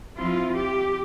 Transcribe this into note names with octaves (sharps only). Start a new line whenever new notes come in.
F3 C4 E4 F4
G4